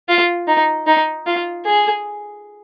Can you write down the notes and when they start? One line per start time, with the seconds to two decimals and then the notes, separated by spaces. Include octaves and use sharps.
0.09 F4
0.48 D#4
0.87 D#4
1.26 F4
1.66 G#4